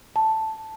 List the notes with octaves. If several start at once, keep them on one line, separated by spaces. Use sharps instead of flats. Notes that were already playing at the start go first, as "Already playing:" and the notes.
A5